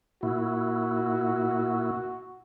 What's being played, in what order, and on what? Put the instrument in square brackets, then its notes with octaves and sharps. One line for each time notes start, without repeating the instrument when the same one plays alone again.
[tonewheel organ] A#2 E4 [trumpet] F#4